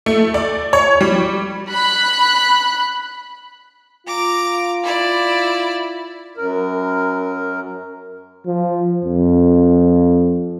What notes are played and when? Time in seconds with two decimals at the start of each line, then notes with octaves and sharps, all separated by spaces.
0.06 A3
0.34 D5
0.73 C#5
1.01 G3
1.70 B5 F#6
4.07 F4 A#5 D6
4.83 E4 D5
6.37 F#2 A#4
8.46 F3
9.04 F2